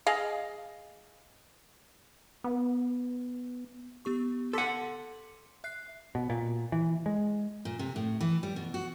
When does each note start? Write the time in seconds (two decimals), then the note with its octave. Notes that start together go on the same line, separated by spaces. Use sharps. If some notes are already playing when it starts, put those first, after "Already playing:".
0.06 G#4 D#5 F5
2.44 B3
4.05 B3 G4 C#6
4.53 A4 F#5 C6 D6 B6
5.64 E5 F#6 C7
6.15 B2
6.30 A#2
6.72 E3
7.06 G#3
7.65 A#2
7.79 C3
7.96 A2
8.21 E3
8.43 G3
8.56 B2
8.74 F#4